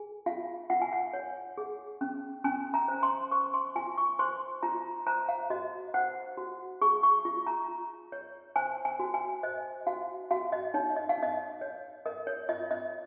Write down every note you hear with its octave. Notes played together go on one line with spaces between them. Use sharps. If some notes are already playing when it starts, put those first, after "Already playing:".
Already playing: G#4 G#5
F4 F5
F4 F#5
G#5
F#5
C#5
G#4
C#4
C#4 G#5
A#5
C5
C6
C5 C#6
C6
F4 G#5
C#6
C5 C6
F4 A#5
C5 A#5
F5
F#4 D#5
C5 F#5
F#4
G#4 C#6
C#6
F4
A#5
F4
C#5
C5 G#5
G#5
F#4
G#5
C5 D#5
F#4 F5
F#4 F5
D#5
D#4 C#5
D#5
F5
D#4 D#5
C#5
A#4 D#5
C#5
F4 D#5
D#5